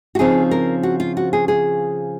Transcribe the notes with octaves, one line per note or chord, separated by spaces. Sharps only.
F#4
C#3 F3 C4 D#4 G#4
A#4
F#4
F4
F#4
G#4
G#4